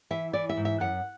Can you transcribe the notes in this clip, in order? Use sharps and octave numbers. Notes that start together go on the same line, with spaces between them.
E3 E5
E3 D5
E5
G#2
E5
F#2 F#5